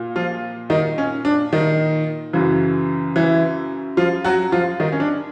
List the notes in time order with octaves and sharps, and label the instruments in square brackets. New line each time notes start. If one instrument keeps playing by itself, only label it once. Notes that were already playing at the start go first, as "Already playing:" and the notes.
Already playing: [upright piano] A#2
F3 F4
D#3 D#4
C#4
D4
D#3 D#4
F#2 C#3 E3
E3 E4
F3 F4
F#3 F#4
F3 F4
D#3 D#4
C#4
D4